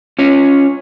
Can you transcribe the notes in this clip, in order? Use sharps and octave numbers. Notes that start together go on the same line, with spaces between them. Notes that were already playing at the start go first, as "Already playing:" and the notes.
C#4 F4 C#5